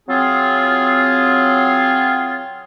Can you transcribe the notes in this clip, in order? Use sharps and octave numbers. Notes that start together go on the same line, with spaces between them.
F#3 C4 F4 G#4